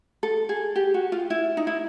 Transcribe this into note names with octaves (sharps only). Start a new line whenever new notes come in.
A4
G#4
G4
F#4
F4
E4
D#4
E4